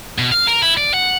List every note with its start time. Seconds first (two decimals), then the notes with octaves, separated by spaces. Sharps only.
0.18 B2
0.32 F5
0.47 A#4
0.62 E4
0.77 D5
0.94 F#5